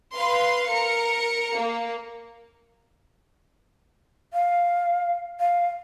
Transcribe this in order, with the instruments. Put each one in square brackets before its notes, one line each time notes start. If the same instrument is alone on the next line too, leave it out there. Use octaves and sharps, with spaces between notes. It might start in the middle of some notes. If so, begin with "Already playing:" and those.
[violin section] B4 F5 C6
A#4 C#7
A#3
[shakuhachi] F5
F5